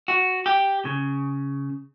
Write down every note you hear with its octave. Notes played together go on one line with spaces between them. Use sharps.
F#4
G4
C#3